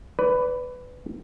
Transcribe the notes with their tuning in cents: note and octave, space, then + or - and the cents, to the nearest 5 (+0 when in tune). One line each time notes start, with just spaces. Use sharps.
B4 +15 D5 -30